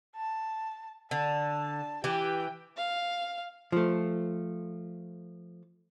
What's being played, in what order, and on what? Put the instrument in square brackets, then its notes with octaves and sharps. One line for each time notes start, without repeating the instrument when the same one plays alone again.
[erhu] A5
[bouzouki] D3 [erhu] A5
[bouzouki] E3 G4 [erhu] G5
[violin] F5
[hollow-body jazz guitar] F3 A3